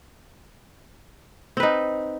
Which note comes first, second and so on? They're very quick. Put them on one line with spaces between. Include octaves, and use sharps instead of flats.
C4 B4 D#4